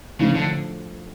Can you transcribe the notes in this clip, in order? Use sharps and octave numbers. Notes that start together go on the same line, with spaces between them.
A2 C#3 F3 A3 D4
D3